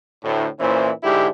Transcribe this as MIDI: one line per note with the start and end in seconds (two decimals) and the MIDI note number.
0.23 0.46 38
0.23 0.46 45
0.59 0.91 46
0.59 0.91 52
0.59 0.91 61
0.59 0.91 64
0.59 0.91 72
1.03 1.28 44
1.03 1.28 50
1.03 1.28 64
1.03 1.28 67